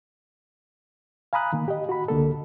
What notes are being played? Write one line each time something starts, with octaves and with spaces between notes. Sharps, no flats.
F5 G#5 A#5 B5 D#6 F#6
D#3 A#3
G4 D#5
F#4 B5
C#2 D3 A#3 A4